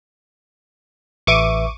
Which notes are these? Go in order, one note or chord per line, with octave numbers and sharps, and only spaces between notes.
A1 B4 E5 C#6 D6 D#7